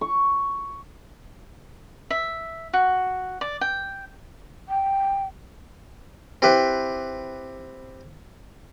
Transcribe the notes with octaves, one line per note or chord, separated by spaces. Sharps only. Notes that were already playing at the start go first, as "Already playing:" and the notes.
C#6
E5
F#4
D5
G5
G5
C4 E4 G4 B4